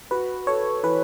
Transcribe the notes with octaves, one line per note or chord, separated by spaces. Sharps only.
F#4 B4
A4 C#5
E3 B4